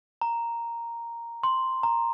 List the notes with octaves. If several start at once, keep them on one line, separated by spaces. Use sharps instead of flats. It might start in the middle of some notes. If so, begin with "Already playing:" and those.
A#5
C6
A#5